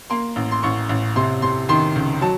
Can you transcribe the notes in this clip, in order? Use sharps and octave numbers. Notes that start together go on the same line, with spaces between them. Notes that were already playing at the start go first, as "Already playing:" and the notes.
A#3 C6
A1
C6
A1 C#6
A1
C3 C6
C3 C6
D#3 C6
C#2
F#3 A5